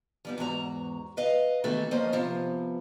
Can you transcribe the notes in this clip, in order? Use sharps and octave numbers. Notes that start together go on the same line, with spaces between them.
F3 G3 B3
E2 G#2 F#4 A#5
B4 D#5 F5
D#3 E3 A3 B3 F#4 A4
F3 A#3 C#4 C5 D#5
C3 F3 B3